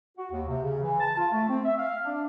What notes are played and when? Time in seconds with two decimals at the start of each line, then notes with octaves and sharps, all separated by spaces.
0.18 F#4
0.31 D#2
0.48 C3
0.63 C#3
0.83 E3
1.00 A5
1.17 F4
1.30 A3
1.49 C4
1.65 E5
1.78 F5
2.04 D4